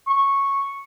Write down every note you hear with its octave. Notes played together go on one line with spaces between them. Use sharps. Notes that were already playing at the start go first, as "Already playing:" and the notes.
C#6